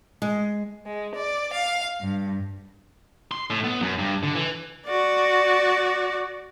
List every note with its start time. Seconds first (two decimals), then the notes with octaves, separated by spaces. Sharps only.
0.22 G#3
0.86 G#3
1.15 D5
1.54 F5
2.00 G2
3.32 C6
3.50 A2
3.64 B3
3.82 F#2
3.99 G2
4.23 D3
4.35 E3
4.86 F#4 D5